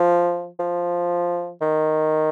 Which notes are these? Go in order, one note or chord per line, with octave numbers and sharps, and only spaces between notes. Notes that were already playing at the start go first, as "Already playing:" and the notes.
Already playing: F3
F3
D#3